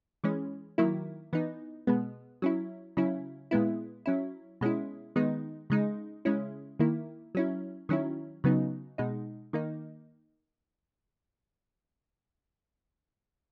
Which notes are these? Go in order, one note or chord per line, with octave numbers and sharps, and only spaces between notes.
E3 G#3 C#4
D#3 F#3 A#3 E4
E3 B3 D#4
B2 G#3 B3
F#3 C#4 E4
C#3 F#3 C#4 E4
A#2 G#3 B3 E4
F#3 C#4 E4
B2 G#3 C#4 E4
D#3 G#3 B3 D#4
C#3 G#3 D#4
C#3 G#3 C#4 E4
D#3 A#3 E4
F#3 C#4 E4
D#3 F#3 C#4 E4
C#3 F#3 B3 D#4
B2 G#3 D#4
D#3 A#3 D#4